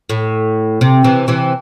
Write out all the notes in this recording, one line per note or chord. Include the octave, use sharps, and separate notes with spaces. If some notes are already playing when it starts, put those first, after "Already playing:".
A2
C3
C3 E3
C3 E3